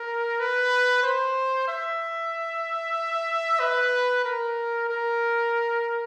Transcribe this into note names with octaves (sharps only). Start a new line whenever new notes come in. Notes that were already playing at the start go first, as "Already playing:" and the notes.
Already playing: A#4
B4
C5
E5
B4
A#4
A#4